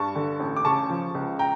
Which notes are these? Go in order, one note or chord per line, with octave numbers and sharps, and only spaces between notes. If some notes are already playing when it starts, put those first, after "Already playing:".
Already playing: G2 A5 C#6
D3
A1
D6
C#3 A5 C#6
F3
C#2
G5 A#5